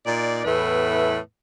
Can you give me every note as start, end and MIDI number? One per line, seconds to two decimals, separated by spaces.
0.06 0.44 46
0.06 0.44 63
0.06 0.44 74
0.45 1.17 40
0.45 1.17 45
0.45 1.17 57
0.45 1.17 59
0.45 1.17 71